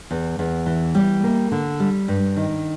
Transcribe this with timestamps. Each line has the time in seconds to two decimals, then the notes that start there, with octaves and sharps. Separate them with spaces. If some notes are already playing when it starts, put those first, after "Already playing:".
0.11 E2
0.39 E2
0.66 E3
0.95 G3
1.24 A#3
1.52 D3
1.80 G3
2.08 G2
2.37 D#3